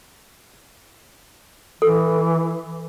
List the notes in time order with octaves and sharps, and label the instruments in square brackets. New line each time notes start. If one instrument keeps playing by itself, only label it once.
[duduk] E3 [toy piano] A4